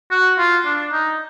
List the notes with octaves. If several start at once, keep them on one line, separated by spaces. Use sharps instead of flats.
F#4
F4
D4
D#4